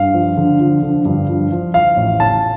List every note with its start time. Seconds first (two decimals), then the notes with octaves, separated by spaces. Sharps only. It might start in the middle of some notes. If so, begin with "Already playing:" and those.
Already playing: G2 F5
0.14 F3
0.37 D3
0.60 F3
0.83 D3
1.05 G2
1.29 F3
1.52 F3
1.74 F3 F5
1.97 A1
2.20 A1 A5